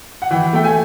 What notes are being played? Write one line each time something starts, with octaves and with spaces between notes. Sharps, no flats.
F#5
E3 G5
A3 G5
G#5